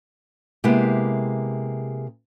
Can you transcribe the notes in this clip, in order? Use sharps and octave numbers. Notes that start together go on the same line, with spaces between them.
C3 G#3 A#3 B3 E4 G4